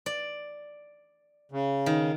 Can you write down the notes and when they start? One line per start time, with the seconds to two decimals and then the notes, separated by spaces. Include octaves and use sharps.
0.06 D5
1.52 C#3
1.86 D#3